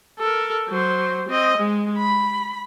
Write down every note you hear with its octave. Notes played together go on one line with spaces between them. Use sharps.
A4 A#4
F#3 C5
C4 D#5
G#3
B5